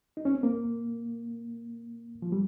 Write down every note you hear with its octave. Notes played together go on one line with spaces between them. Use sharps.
D#4
C#4
C4
A#3
F3
G3